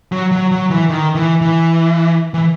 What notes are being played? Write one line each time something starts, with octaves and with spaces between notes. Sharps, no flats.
F#3
F#3
F#3
E3
D#3
E3
E3
E3